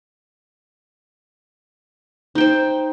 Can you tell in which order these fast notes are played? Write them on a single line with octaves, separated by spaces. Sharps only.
D#4 G5 C5